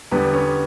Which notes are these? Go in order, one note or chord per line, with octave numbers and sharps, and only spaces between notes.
E2 D3 G3 B3
C#4